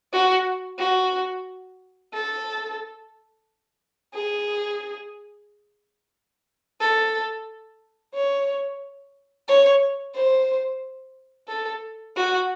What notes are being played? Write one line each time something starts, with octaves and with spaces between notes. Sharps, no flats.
F#4
F#4
A4
G#4
A4
C#5
C#5
C5
A4
F#4